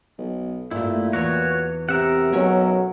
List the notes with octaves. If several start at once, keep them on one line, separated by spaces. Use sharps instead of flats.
B1
G2 A#2 A3 E4
E2 E3 F#4 C#5
C3 A#4 E5 F#5
B1 F#3 C#4 G#4 C#5